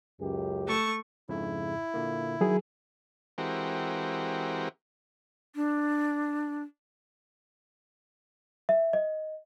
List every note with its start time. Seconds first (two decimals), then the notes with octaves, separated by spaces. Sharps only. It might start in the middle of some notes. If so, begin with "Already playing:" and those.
0.20 C#2 F#2 G4
0.68 A3 C#6
1.29 F2 G#2 C#3 E4
1.94 A#2 D3 A#3
2.41 D#3 F#3 G#4
3.38 E3 G#3 C4 F#4 G4 A#4
5.56 D4
8.69 E5
8.93 D#5